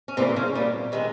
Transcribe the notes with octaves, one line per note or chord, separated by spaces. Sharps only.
C#4
A2 C3 E3 G3 A#3 C4
C#3 C#4
A#2 G3 A#3
C3 D#3 G#3